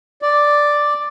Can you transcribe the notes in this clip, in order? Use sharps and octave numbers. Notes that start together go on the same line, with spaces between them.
D5